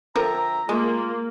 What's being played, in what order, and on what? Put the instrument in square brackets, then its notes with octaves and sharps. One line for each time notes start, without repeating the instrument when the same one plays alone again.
[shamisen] D3 F3 A#4 [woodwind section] E5 G5 A#5
[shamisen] G#3 [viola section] A#3 [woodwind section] F4